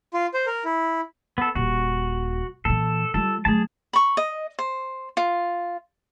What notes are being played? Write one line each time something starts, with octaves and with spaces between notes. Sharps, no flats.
F4
C5
A#4
E4
B3 A4
D#1 F#4
A#2 E3 A4
G3 F4 A4
F#3 A3 G#4 A5
B5 C#6
D#5
C5
F4